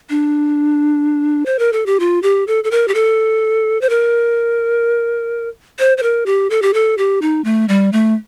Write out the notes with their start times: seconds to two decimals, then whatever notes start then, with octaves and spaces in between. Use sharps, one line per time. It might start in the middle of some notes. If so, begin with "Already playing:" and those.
0.10 D4
1.46 C5
1.59 A#4
1.73 A4
1.86 G4
2.00 F4
2.23 G4
2.47 A4
2.64 A4
2.71 A#4
2.88 G4
2.95 A4
3.81 C5
3.89 A#4
5.79 C5
5.98 C5
6.03 A#4
6.26 G4
6.50 A4
6.62 G4
6.74 A4
6.98 G4
7.22 D#4
7.44 A3
7.69 G3
7.93 A3